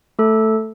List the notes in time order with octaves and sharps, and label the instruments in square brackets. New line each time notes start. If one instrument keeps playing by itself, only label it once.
[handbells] A3 A4